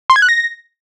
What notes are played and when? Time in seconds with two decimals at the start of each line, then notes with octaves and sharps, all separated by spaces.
0.10 C6
0.16 G#6
0.22 F#6
0.29 A#6